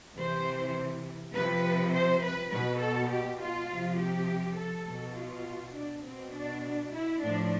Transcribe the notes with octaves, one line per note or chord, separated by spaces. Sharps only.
C3 E3 C5
C3 F3 B4
C5
B4
B2 B4
A4
G4
F4
C3 F3
G4
A4
B2
F4
D4
B2 C4
D4
E4
A2 F3 D4